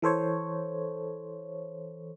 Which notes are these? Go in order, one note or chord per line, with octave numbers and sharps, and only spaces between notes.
E3 A4 C5 C#5